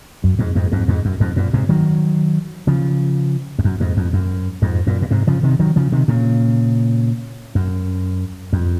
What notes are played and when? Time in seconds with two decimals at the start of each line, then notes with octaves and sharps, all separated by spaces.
0.24 F#2
0.39 F2 G#2
0.55 F2 G#2
0.72 F2 G#2
0.88 F2 G#2
1.05 F#2
1.20 F2 G#2
1.36 F#2 A#2
1.53 G#2 C3
1.69 D#3 F#3
2.67 C#3 F3
3.59 F2
3.64 F#2
3.80 F2 G#2
3.97 F2
4.13 F#2
4.62 F2 G#2
4.87 F#2 A#2
5.02 A#2
5.11 G#2 C3
5.27 C#3 F3
5.43 C3 D#3
5.59 D#3 F#3
5.76 C#3 F3
5.92 C3 D#3
6.08 A#2 C#3
7.55 F#2
8.53 F2